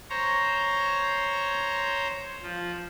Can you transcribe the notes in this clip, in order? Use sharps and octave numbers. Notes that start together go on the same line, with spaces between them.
C5 C#5 A#5
F3